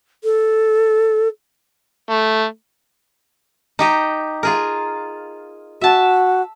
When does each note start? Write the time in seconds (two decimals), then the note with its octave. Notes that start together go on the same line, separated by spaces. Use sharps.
0.24 A4
2.10 A3
3.79 D#4 G4 D#5
4.43 F4 G#4 A#4
5.81 F#4 E5 A5